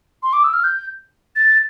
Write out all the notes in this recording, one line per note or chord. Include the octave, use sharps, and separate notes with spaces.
C6
D6
E6
F6
G6
A6